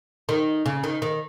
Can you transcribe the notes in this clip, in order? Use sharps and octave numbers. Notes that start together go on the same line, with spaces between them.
D#3
C#3
D#3
D#3